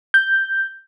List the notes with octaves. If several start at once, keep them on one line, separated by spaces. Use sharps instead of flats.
G6